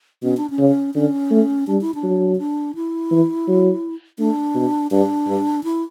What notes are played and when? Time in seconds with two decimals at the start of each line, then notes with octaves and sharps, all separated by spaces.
0.23 B2 C#4
0.37 D4
0.50 C#4
0.59 C#3
0.95 D3 C#4
1.31 A3
1.67 G3 D4
1.81 E4
1.95 D4
2.03 F#3
2.35 C#4
2.39 D4
2.75 E4
3.11 E3
3.48 F#3
4.19 A3 D4
4.55 B2
4.91 G2 D4
5.27 G2
5.64 E4